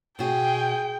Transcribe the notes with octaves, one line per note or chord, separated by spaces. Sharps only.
B2 F#4 G#4 G5